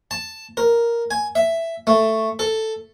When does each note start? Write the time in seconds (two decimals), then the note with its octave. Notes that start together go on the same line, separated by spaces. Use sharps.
0.11 A5
0.57 A#4
1.11 G#5
1.35 E5
1.87 A3
2.39 A4